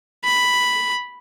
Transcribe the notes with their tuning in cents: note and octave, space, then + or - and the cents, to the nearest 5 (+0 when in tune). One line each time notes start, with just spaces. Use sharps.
B5 +0